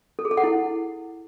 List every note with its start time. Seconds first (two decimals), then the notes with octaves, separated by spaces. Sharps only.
0.19 A4
0.25 G#4
0.31 A4
0.37 F#5
0.44 E4